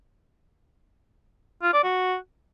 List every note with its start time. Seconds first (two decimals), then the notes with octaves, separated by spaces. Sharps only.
1.63 F4
1.73 D5
1.83 F#4